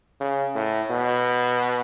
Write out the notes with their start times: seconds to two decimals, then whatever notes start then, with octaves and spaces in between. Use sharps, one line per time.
0.21 C#3
0.56 A2
0.91 B2